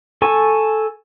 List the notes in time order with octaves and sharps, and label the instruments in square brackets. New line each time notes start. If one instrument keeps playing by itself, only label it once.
[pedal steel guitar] A4 G#5 C#6